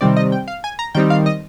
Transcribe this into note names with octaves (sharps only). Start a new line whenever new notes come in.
C3 D#3 G3 C4 D5
D#5
G5
F5
G#5
A#5
D#3 G3 C4 D#4 G5
F5
D#5